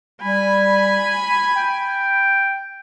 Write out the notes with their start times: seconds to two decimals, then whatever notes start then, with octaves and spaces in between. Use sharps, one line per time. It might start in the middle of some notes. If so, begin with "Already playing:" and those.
0.22 G3 G#5 B5
1.56 G5